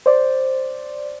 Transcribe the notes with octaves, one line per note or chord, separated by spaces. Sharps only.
C5 D5